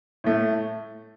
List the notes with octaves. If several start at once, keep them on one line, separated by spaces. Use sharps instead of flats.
A2 A3